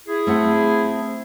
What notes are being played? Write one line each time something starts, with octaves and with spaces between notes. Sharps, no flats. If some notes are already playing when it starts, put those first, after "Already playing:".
E4 G#4
A3 C4 F#5